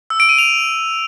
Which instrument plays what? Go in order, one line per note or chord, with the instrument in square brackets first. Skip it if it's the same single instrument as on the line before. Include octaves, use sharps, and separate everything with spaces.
[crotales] E6
D7
D#7
F7